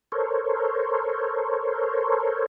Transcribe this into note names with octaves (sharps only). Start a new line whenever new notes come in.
A4 A#4 C5 C#5